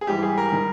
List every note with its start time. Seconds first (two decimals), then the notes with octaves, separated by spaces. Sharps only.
0.01 G#4
0.07 G#2 E3 G3 G4
0.22 G#4
0.38 A#4
0.52 D#3 G3